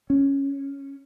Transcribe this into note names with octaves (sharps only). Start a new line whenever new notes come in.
C#4